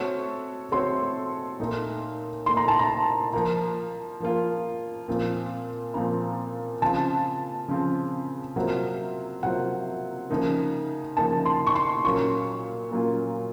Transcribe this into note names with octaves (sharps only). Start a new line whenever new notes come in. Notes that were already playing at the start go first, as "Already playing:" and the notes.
Already playing: A3 C4 F#4 A4 C#5 C#6
A3 C4 F#4 A4 C#5 C6
A#2 A3 D#4
A#2 A3 D#4 C6
A#5
A5
A#5
F3 A#3 F4 A#5
F3 A#3 F4
A#2 F3 C4 F4
A#2 F3 C4 F4 A#5
C#3 F3 C4 F4 A5
C#3 F3 C4 F4
C3 F#3 A#3 F4 C5 F#5
C3 F#3 A#3 F4 C5 F#5
C#3 F3 A#3 D#4
C#3 F3 A#3 D#4 A5
C6
C#6
C6
A#2 F#3 A#3 C#4 F4 C#6
A#2 F#3 A#3 C#4 F4